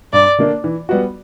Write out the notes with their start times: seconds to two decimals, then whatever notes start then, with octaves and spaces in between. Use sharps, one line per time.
0.13 G2 D5
0.38 D3 A#3 D4
0.64 E3
0.89 G3 B3 F#4